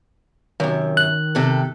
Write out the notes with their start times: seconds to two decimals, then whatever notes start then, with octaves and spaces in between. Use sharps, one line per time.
0.60 F#2 C3 D#3
0.97 F#6
1.35 C3 A4